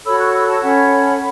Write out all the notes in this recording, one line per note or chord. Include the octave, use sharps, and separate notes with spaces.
F#4 A4 C#5 B5 E6
C#6 F#6
B5 E6
A5 C#6
C#4 A4 C#5 F#5 B5